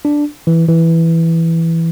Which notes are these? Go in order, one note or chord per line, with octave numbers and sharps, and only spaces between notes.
D4
E3
E3